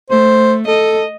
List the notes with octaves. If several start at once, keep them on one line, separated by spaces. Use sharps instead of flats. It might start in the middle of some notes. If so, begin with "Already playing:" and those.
A3 C5
A4 D#5